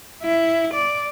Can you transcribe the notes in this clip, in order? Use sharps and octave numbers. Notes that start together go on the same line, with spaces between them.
E4
D5